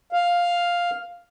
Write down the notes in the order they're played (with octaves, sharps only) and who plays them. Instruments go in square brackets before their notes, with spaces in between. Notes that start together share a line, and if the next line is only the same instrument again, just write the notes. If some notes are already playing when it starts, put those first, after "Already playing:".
[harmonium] F5